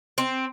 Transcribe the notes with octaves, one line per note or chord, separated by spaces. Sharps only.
C4